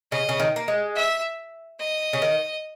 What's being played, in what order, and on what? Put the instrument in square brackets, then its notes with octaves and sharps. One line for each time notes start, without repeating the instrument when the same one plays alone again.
[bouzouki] C#3 [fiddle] D#5
[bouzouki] C#3
D#3
A#3
G#3
[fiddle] E5
D#5
[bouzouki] C#3
D#3